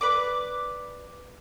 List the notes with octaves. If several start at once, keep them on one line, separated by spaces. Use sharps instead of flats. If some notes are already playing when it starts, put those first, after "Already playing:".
B4 D5 D6